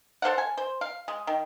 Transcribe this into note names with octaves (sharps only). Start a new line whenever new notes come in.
A4 C5 F5 F#5
G#5
C5
F5
G#3
D#3